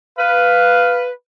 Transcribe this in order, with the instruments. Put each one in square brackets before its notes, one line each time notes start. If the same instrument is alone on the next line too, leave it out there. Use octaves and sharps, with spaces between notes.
[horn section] B4 [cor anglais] F5